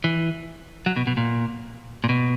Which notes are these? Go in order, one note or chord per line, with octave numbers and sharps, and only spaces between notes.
E3
F#3
B2
B2
A#2
A#2
B2